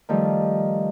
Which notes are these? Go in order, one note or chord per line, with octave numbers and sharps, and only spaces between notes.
D#3 F3 G3 A3